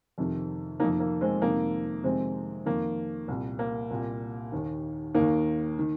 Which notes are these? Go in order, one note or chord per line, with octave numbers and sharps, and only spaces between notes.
F2 C3 D#3
F2 C3 D#3 A#3 D#4
A#3
G#3 C4
F2 C3 D#3 A#3 D#4
F2 C3 D#3 G#3 C4
F2 D#3 A#3
C2 A#2
A#3
C2 A#2
D#2 D#3
D#2 D#3 A#3 D#4
D#3